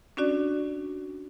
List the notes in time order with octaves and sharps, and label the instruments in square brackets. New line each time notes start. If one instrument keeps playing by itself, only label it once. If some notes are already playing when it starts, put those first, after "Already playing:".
[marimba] C#4 D4 F#4 D5